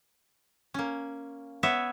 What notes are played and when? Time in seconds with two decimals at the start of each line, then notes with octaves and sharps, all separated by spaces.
0.74 A#3 C#4
1.63 B3 C#5 E5